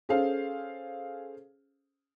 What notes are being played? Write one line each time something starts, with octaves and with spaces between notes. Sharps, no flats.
C#4 G#4 A4 C5 F5